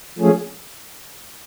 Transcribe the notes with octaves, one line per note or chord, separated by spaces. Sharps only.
F3 A3 C#4 G#4